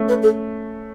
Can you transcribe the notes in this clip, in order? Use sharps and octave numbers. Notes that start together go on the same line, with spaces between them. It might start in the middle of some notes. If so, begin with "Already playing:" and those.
Already playing: A3 C#4
B4
A4